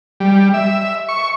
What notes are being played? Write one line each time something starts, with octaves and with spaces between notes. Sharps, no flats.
G3
E5
C#6